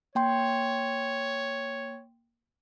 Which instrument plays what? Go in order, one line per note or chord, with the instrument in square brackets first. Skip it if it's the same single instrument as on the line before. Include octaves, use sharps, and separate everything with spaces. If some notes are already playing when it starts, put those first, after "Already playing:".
[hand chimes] A#3 G5 C6 [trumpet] C#5